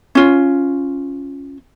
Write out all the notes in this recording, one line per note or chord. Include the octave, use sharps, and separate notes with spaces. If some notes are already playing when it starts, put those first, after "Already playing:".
C#4 F4